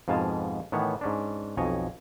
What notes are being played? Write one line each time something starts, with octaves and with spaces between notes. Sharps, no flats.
F2 G#2 B2 F5 G#5 A5
A2 D#3 E3 B3 C#5
G#2 C#4 D4
B1 F2 C#5 D#5 G#5